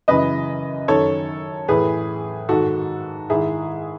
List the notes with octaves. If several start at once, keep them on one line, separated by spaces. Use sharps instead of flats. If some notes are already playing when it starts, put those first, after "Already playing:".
F#2 C#3 E3 B4 D#5
F#2 D#3 A4 C#5
A2 E3 G#4 B4
G#2 D#3 F#4 A4
G#2 D#3 E4 G#4